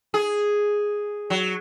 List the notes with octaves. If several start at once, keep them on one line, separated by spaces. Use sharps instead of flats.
G#4
F#3